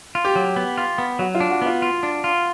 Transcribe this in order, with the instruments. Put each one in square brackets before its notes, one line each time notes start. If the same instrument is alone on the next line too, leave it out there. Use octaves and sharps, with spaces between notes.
[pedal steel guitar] F4
[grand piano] G4
[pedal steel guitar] F#3
B3
F4
B3
[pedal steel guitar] F#3 [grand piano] F#4
[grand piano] F4
[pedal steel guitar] D4
[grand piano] F#4
[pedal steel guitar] B3 [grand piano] F4
[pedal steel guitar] F4
D4
F4